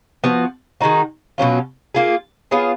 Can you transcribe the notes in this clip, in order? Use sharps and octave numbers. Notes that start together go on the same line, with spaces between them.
F3 B3 F#4
D#3 G#3 D#4 F#4
B2 F#3 C#4 F4
A#3 F4 G#4
B3 F4 G#4 C#5